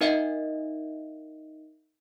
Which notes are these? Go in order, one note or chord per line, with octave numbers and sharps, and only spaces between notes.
D#4 A#4 D#5 E5 F#5